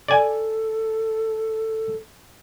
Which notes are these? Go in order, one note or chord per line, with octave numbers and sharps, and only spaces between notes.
A4 D5 G#5